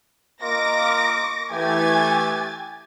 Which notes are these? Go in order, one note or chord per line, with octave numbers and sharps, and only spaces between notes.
A#3 F4 A#4 D#5 D6 A#6
E3 A3 G4 G#5 G#6 A6